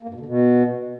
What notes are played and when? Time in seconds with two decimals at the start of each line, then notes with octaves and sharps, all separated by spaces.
0.03 A#3
0.09 G2
0.14 B2
0.20 D3
0.26 B2